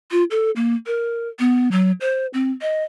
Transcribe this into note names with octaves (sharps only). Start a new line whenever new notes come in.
F4
A4
A#3
A#4
B3
F#3
C5
C4
D#5